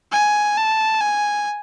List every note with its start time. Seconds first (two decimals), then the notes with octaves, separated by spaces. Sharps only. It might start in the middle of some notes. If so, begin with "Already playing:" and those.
0.12 G#5
0.57 A5
1.01 G#5